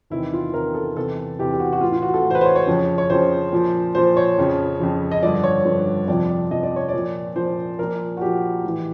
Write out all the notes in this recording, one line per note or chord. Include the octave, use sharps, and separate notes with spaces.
E2 C3 D#3 E4
F4
E2 C3 D#3 A#4
A4
E2 C3 E3 A4
E2 C3 E3 G4
G4
F#4
F#4
A2 E3 F4
F4
F#4
A4
A2 E3
C5
B4
C5
C#5
C#5
F2 C#3 F3
C#5
F2 C#3 F3 C5
A#2 F3
A#2 F3 C5
C#5
F2 C#3 F3
F2 C#3 F3
D#5
G2 D3 F3 D5
C#5
G2 D3 F3
F2 C3 F3 D5
F2 C3 F3 D#5
D5
C#5
D5
A#2 F3
A#2 F3 C5
A#2 F3 A#4
F#4
A#2 F3 G4
A2 E3